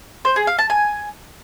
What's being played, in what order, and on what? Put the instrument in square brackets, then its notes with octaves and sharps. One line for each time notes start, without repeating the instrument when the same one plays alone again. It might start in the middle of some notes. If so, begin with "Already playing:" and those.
[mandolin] C5
G#4
F5
A5
G#5